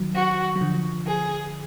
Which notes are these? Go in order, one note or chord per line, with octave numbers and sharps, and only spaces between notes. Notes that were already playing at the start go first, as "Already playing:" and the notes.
Already playing: D#3 F#3
F#4
F#3
D3 F3
G#4